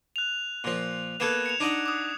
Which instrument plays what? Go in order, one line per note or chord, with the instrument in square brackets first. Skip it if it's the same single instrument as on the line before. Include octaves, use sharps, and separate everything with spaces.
[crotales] F#6 F7
[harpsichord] A#2 F3
[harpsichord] A#3 B3 A4 [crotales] F#6 G#6 E7
[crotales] C#7 F7
[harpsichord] D4 D#4 F#5
[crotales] D6 D#6